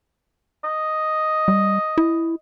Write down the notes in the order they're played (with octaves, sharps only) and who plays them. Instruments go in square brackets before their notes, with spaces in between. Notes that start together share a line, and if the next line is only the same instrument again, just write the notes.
[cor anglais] D#5
[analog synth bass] G3
E4